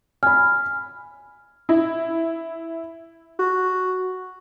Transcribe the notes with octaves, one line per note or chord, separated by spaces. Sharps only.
G#5 B5 F6
E4
F#4